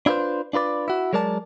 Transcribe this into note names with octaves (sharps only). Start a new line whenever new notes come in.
D4 E4 F4 A4 B4 C5
D4 F4 B4 D5
E4 F#4
F#3 G#3 A#4 D5 A5